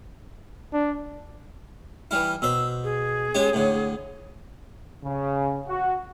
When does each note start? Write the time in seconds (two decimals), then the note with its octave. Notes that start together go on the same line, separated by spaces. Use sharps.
0.73 D4
2.11 E3 G3 E4 F6
2.42 B2 C5 E6
2.84 G#4
3.35 G#3 C#4 G4
3.53 A2 D3
5.04 C#3
5.68 F#4